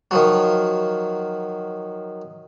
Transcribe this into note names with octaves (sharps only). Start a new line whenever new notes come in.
D#3 F3 F#3